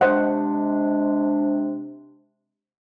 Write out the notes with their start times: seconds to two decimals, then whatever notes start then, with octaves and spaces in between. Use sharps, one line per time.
0.01 C3 G#3 D4 C5 D#5 F#5